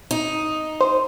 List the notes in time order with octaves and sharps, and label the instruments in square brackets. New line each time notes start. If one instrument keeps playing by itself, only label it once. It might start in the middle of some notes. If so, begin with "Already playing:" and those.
[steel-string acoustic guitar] D#4
[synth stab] C5